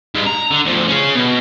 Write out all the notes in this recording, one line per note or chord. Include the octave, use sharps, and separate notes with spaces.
G2 G#3
A#5
D3
D2 F3
C#4 G#4
B2